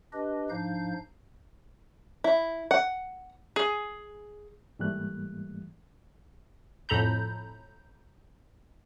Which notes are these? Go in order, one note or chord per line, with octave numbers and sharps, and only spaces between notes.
D4 G4 B4 D#5
G#2 F3 D4 D#4 F5 G6
E4
F#5
G#4
G#2 E3 G3 A3 A#3 F#6
F2 A2 A4 A#5 B5 G6